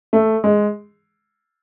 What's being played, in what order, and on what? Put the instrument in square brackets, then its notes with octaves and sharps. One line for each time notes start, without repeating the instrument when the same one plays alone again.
[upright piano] A3
G#3